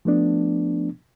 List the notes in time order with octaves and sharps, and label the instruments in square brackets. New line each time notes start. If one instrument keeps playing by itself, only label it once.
[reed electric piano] F3 A3 B3 D4